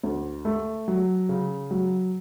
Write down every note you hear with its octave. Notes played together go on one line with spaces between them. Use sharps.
D2
A3
F#3
C#3
F#3